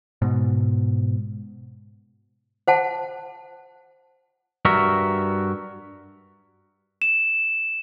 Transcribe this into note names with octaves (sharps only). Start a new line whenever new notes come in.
G#2 B2
C5 F#5 A5
G2 F#4 A#4 E5
E7